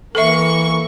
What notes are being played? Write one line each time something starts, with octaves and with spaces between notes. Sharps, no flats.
E3 A#3 A4 E5 C#6